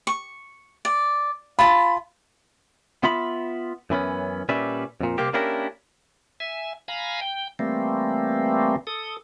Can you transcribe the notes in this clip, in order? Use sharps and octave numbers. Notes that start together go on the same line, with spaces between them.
C#6
D5
F4 A5 B5
B3 F4 E5 B5
F#2 E3 B3 C#4
A#2 G3 C#4 B4 D5 E5
F2 A#2
C2 A#3 C4 G4
A#3 C#4 D4 E4 G4 A#4
E5 G#5
F5 G#5 A#5 B5
G5
E3 G3 A3 A#3 C4
A4 D#6